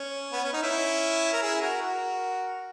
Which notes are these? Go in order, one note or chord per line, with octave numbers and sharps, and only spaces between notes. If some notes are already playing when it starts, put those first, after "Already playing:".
Already playing: C#4
B3
C#4
D#4
C#4 E4
A#4
E4 G#4
F#4 A#4
F#4 A#4